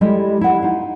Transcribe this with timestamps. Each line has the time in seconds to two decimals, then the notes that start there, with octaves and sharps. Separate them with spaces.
0.01 G3 G#3 E4 G4 A4 D#5
0.41 E4 F#5
0.62 D#4 F4